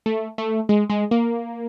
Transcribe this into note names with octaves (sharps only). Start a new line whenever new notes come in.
A3
A3
G#3
G#3
A#3